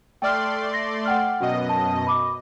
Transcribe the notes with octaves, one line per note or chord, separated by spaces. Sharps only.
A3 D5 G5 C6 F6
A#6
F#5 G5 F6
F#2 B2 D#5
A5
B5 D6